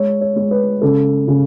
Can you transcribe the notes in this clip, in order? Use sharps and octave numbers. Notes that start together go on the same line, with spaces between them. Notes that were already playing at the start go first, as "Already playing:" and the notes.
Already playing: G#3 C#5
C#5
G#3
B4
C#3 A4
C#3